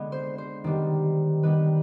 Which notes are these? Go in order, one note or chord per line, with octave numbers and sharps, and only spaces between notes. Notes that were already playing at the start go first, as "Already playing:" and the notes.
Already playing: D3 G#3 B3
C5
C5
D#3 G3 B3
D#3 G3 B3 B4